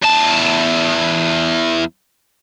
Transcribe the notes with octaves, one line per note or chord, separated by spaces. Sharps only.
E2 A5